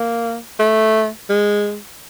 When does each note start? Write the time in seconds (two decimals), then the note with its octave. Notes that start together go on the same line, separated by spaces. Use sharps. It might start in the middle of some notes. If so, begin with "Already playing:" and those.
Already playing: A#3
0.59 A3
1.30 G#3